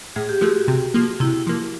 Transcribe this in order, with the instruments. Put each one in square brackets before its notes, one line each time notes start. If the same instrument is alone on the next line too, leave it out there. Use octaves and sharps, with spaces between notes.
[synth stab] A2 [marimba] G#4
[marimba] G4
[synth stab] F3 A3 [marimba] F#4 G#4
[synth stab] C3
F3 A#3
[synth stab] C3 [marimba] E4
[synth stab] F3 A#3